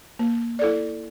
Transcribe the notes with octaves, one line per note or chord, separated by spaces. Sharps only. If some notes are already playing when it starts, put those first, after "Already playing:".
A#3
E4 A4 D5